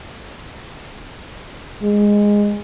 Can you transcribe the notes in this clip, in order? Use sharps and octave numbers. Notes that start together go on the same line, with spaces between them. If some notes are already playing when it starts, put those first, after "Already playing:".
G#3